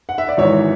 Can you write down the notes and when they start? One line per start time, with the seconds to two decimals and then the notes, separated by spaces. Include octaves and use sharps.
0.09 F#5
0.18 E5
0.29 D5
0.37 G#1 G#2 E3 C#5 E5